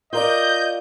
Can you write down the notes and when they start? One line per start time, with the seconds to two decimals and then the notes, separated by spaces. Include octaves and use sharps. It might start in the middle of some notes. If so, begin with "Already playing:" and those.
0.13 F4 A#4 D5 D#5 G6